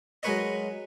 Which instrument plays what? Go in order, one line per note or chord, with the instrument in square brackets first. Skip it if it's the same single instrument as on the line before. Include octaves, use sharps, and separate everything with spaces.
[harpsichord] F#3 G#3 A#4 B4 C#5 D#5